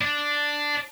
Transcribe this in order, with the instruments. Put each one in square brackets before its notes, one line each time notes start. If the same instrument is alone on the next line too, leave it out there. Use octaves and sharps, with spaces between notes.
[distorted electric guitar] D4